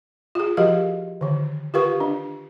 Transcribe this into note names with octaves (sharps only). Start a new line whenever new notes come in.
F4 G#4
F3 F#4 G4 A#4 D#5 F5
D3 D#3
F4 G4 A#4 B4 F5 C#6
D4